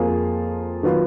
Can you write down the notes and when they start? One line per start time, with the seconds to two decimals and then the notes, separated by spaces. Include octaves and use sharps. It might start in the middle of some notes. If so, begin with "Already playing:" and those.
Already playing: F2 F3 A#3 F4 G#4
0.83 D#3 F#3 B3 F4